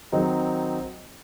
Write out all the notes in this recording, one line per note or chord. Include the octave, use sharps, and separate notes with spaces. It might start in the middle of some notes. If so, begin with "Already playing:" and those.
D#3 F#3 C4 D#4